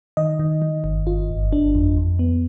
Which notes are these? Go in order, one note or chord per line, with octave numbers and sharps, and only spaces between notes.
D#3 D#5
D#3
D#3
G1
G1 F4
G1
G1 D4
F2
F2
B3